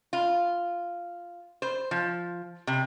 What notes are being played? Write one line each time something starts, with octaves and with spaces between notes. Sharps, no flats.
F4
C5
F3
C3